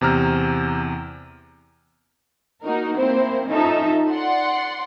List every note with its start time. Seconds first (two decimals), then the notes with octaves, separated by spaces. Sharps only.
0.01 E2 C3 A#5 F6
2.64 A#3 D#4 F#4 A#4
2.97 A#3 C4 E4 C5
3.48 C#4 D#4 F4 A4 E5 A5
4.11 D5 F#5 C6